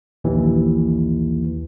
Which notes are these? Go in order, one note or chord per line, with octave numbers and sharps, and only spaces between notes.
A#1 D#2 E3